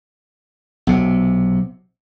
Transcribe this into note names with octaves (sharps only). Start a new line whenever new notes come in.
B1 C3